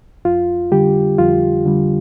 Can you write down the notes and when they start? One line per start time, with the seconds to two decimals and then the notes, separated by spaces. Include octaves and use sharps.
0.25 F2 F4
0.72 D3 G3 G4
1.18 F2 F4
1.65 D3 G3